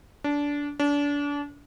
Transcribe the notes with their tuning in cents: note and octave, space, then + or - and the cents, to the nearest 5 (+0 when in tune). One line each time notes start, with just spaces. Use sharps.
D4 -20
D4 -30